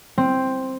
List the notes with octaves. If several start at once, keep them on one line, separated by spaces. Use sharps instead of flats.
C4